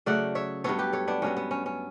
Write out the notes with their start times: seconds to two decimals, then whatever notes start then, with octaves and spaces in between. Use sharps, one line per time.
0.06 C#3 F#3 A3 D5 F#5
0.35 C#5 E5
0.64 G2 F#3 B3 A4 C#5
0.78 G4 B4
0.93 A4 C#5
1.08 B3 D4
1.22 G2 F#3 B3 C#4
1.37 B3
1.51 C#4
1.66 C#4